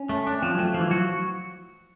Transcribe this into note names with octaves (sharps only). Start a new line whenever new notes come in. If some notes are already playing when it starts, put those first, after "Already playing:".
Already playing: C#4
A3
D4
F3 C4
F#3 A3
F3
E3
F#3 F#4